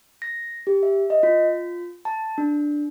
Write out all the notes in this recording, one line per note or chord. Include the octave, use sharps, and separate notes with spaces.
A#6
G4
E5
D#5
F4
A5
D4